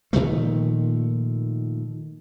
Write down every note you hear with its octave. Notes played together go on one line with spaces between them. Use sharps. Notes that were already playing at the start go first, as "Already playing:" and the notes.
A#2 D#3 F3 A3